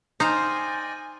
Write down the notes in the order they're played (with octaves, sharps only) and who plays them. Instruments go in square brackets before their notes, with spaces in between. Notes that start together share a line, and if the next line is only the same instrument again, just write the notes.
[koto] D#4 [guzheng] C5 F5 A#5 [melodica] D5 D#5 G5 [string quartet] G#5